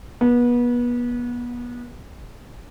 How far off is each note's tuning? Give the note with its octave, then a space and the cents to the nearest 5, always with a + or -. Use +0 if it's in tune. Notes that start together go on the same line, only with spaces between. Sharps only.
B3 -30